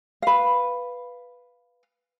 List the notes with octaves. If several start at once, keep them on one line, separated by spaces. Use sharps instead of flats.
B4 F5